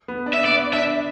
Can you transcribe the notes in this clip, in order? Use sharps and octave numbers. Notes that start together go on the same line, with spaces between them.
B3
D4
E5
B3 D5
D4 E5